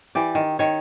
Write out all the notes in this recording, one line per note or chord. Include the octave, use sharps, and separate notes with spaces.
E3 G4 D5
D#3
D#3 C#5